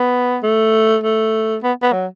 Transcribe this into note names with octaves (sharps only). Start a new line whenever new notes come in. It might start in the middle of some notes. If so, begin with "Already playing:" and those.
Already playing: B3
A3
A3
B3
B3
F#3